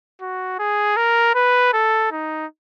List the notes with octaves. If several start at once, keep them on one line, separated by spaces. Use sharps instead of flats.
F#4
G#4
A#4
B4
A4
D#4